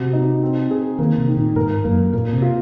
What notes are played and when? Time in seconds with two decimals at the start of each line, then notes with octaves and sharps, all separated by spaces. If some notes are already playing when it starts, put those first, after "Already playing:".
Already playing: C3 F#4
0.13 D#4
0.42 C4
0.71 G#4
0.99 D#3 A#3
1.18 C3
1.27 D#3
1.37 A#2
1.55 G#2 A#4
1.84 F#2 A#3
2.13 A#2 A#3
2.33 C3
2.42 F4